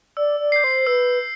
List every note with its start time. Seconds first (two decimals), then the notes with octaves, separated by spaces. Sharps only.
0.17 D5 E6
0.40 D5
0.52 G6 C7
0.64 C5
0.87 B4 E6